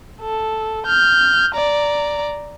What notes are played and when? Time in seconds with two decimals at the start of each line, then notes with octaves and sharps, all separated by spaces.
0.21 A4
0.87 F6 G6
1.54 D5 A#5